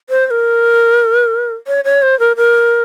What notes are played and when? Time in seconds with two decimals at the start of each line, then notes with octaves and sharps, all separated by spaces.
0.10 C5
0.27 C5
0.31 A#4
1.67 C#5
1.85 C#5
2.02 C5
2.20 A#4
2.37 A#4